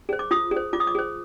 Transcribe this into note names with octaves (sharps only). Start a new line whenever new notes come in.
G#4 C5
D6
F4 D#6
G#4
C5
F4 D6
D#6
D6
G#4 C5